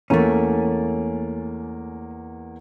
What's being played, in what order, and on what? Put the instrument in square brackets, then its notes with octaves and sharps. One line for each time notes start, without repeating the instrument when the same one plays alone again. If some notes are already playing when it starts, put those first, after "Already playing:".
[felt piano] E2 A#3 [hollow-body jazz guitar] A3 C#4